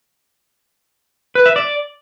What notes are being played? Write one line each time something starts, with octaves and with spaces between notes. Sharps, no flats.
B4
E5
D5